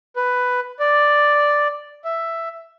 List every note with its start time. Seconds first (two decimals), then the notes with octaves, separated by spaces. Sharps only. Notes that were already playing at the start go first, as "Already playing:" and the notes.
0.16 B4
0.80 D5
2.05 E5